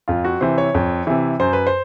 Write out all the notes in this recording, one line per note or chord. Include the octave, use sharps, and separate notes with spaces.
F2 F4
F#4
C3 E3 C5
C#5
F2
C3 E3
F#2 C5
B4
C5